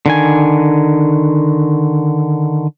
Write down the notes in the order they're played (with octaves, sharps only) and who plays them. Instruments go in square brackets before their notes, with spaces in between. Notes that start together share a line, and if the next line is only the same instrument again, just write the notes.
[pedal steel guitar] D3 D#3 G#5